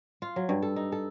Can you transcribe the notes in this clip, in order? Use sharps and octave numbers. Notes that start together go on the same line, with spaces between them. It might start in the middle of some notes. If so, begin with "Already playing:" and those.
F4
F#3
G2
A4
D#4
A4